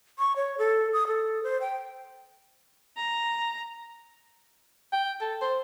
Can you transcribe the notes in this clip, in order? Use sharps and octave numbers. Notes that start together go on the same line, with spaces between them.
C#6
C#5
A4
D#6
A4
C5
G5
A#5
G5
A4
C5